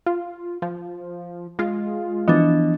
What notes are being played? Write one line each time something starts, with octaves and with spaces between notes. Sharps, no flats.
F4
F3
G#3 F4
E3 F3 B3 D4 D#5